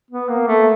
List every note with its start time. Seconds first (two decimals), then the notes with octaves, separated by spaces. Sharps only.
0.11 B3
0.29 A#3
0.47 A3